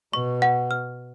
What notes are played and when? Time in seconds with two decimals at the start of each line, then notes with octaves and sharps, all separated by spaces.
0.13 B2 C#6
0.42 F#5
0.71 F6